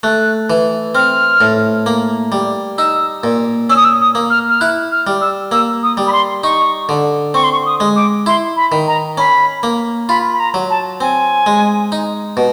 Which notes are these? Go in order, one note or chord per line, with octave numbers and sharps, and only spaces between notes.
A3 F#6
E3
C4 F6
A2
A#3
G3
D#4 E6
A#2
C#4 E6
D#6
E6
D#6
A#3
F6
F6
E4 F#6
F6
G3
E6
A#3 E6
D#6
G3
B5
C6
D#4 C#6
D3
C4 C#6
C6
C#6
D#6
G#3
D6
E4 C6
B5
D#3
A#5
C#4 B5
A#3
F4 B5
B5
A#5
F#3
A5
C4 G#5
G#3
D#4
B2